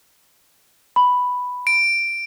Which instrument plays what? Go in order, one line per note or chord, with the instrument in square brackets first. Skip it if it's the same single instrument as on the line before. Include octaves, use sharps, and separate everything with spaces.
[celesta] B5
[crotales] D7